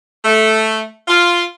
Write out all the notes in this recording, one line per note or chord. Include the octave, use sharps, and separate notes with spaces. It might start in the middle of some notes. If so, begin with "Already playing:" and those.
A3
F4